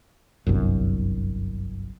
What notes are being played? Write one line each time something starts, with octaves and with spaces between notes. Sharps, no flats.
G1 C2 F#2